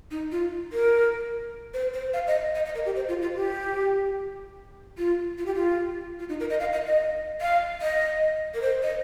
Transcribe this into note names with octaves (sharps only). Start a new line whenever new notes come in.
D#4
F4
A#4
C5
C5
F5
D#5
D#5
D#5
A#4
G4
C5
F4
F4
G4
F4
F4
G4
F4
F4
D#4
A#4
D#5
F5
D#5
D#5
F5
D#5
A#4
C5
D#5